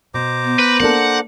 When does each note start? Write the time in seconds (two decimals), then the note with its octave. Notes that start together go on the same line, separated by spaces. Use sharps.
0.14 B2 C5 A#5 D6
0.44 B3
0.59 B4
0.80 A#3 D4 A4 F#5